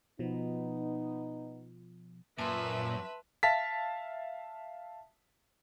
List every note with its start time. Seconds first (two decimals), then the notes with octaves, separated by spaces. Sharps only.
0.19 B2 F3 B3 D#4
2.38 F#2 A#2 B4 E5 A5 C6
3.43 E5 F5 A5 A6 B6